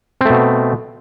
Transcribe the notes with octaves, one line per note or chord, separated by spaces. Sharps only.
B2 A3 C4